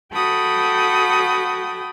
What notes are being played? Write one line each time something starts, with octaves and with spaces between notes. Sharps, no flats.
F#4 A4 G5 B5 D#6